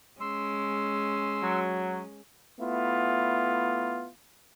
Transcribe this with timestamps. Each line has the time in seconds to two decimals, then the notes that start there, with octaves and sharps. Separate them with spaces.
0.21 G#3 C#4 C6 E6
1.43 F#3
2.60 A3 B3 E4 F4